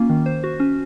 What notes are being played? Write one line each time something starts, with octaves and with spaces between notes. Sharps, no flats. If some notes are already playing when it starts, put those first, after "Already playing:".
Already playing: A#3 C#4 F4
D#3
C5
F#4
C#4